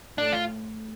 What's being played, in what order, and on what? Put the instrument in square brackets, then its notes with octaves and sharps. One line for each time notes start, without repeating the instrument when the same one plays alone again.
[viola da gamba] A2 A3 [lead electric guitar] D4
[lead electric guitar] F4